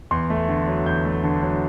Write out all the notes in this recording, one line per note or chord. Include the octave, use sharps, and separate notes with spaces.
E2 C6
A3
D3
F#3
E2 G6
A3
D3
F#3